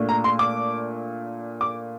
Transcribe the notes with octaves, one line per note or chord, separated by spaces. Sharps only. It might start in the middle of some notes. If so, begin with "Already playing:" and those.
Already playing: A#2 A3 D4
A#5
C6
D6
D6